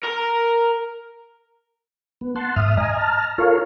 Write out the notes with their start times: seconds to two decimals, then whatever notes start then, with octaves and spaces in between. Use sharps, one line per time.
0.03 A#4 A#5
2.21 B3
2.36 F#5 A5 C6
2.56 G#2 E5 D#6 F6
2.77 D#5 G#5 A#5 D#6 F6
2.97 A5 A#5 F6
3.38 F4 A4 A#4 C#5 F5